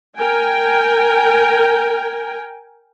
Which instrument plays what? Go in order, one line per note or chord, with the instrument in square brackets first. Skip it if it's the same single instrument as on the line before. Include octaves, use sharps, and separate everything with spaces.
[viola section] A#4 G5 G#5